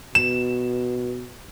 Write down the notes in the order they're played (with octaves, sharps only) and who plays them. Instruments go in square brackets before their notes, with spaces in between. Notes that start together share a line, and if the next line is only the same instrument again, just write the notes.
[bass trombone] B2 [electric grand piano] E7